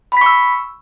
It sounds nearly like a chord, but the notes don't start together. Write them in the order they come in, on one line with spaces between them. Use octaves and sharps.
B5 B6 C#6 E6